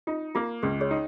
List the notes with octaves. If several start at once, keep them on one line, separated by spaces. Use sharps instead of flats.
D#4 F4
A#3 F4
C#2 G#4
G#4 C#5
D#4